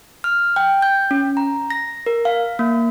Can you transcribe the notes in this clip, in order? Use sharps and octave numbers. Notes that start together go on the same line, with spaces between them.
F6
G5
G6
C#4
A#5
A#6
A#4
F5
A#3